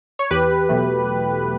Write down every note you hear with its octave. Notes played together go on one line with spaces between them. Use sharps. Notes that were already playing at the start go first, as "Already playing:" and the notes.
C#5
E2 G4 B4
B2 F#3 A3